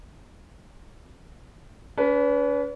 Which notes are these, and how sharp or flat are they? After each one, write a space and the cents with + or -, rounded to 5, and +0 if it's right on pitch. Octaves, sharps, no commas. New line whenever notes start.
C#4 +45 B4 +0